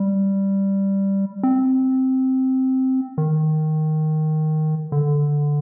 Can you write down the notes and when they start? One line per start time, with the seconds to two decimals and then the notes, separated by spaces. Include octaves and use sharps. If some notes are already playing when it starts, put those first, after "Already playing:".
Already playing: G3
1.43 C4
3.18 D#3
4.92 D3